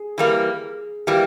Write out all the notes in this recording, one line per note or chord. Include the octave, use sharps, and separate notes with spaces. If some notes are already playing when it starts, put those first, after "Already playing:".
Already playing: G#4
E3 G3 A#3
E3 G3 A#3 G4